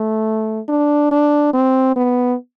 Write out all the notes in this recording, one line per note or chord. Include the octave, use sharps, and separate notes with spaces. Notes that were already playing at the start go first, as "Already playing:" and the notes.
Already playing: A3
D4
D4
C4
B3